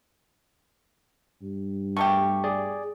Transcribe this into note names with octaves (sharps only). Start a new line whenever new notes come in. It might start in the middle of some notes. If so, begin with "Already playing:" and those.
G2
B2 A3 G4 C#6
G#4 D5